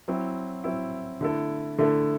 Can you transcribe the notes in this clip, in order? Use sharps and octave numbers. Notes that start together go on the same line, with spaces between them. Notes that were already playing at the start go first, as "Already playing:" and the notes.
F#3 C4 E4
F#3 C4 E4
D3 A3 E4 A4
D3 A3 E4 A4